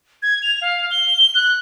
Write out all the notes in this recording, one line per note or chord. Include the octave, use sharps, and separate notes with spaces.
G#6
F7
F5
G7
F#6